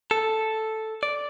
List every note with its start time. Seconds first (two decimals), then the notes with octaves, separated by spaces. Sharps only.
0.11 A4
1.03 D5